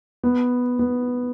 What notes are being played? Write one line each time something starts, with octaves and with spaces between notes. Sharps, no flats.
B3
B3